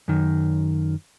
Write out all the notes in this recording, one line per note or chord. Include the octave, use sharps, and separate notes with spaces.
F#2 D#3